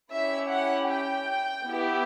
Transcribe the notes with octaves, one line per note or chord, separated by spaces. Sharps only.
C#4 E4 G4 E5
F#5
G5
B3 E4 G4